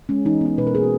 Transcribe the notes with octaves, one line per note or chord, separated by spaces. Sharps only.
G#3 C#4
E3 D#4
B3 D#4
B2 B4
A#4
A#3 D#4 G#4
F#4